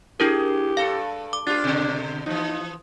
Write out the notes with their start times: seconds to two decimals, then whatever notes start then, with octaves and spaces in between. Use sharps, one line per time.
0.20 D4 E4 G4 G#4 A#4
0.77 G2 A4 F5
1.33 D6
1.47 D4 F4 G4 A6
1.64 B2 D3
2.26 E3 F3 D#4